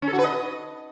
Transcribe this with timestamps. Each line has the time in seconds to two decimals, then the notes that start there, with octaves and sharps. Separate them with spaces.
0.02 C#4
0.08 A4
0.13 F#4
0.19 B4
0.24 D#5